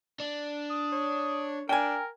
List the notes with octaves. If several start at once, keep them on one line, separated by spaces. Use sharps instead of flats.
D4
D#6
C#5
D4 A#4 G5 G#5